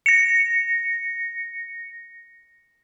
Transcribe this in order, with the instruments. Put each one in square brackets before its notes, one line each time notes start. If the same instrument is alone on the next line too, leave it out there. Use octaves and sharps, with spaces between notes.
[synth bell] A#6 C#7